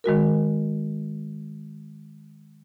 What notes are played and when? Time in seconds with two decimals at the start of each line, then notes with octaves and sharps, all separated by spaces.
0.04 D#3 G#3 F#4 A#4